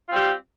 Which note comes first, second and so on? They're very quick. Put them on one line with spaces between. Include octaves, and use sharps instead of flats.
F4 C4 G3 G4